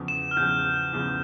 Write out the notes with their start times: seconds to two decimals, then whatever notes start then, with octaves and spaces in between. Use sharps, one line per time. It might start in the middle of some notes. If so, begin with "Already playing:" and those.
Already playing: E2 C#3 F3
0.08 E7
0.31 F6
0.37 E2 C#3 F3 G6
0.93 E2 C#3 F3